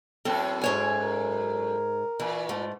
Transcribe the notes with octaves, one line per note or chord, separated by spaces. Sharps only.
F#2 A2 C4 A4
G#2 C#5 G#5
A#4
A#2 E3
G#2 A3